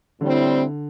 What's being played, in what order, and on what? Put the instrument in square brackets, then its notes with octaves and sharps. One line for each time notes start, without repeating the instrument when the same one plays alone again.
[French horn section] A2 G3 C4 E4 [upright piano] D3